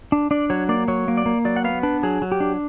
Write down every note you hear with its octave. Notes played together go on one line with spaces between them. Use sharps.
D4
D4 D5
F#3 C#5
A#3 D5
F#3 C#5
A#3
D5
A#3
F#3 D5
F#5
B3 F5
D4 B4
F#3 G#4
F#3
G4
D4